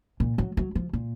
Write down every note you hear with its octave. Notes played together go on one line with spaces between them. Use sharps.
A#2
F#3
F#3
F3
A#2